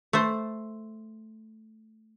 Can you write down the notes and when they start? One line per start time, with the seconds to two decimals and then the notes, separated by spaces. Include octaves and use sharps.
0.13 A3 C5